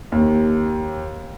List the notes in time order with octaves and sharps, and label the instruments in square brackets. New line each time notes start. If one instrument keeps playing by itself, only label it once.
[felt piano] D#2